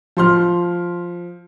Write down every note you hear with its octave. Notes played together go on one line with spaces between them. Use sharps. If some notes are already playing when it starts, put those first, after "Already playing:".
F3 C6 F6